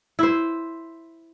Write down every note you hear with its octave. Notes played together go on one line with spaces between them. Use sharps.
E4 C5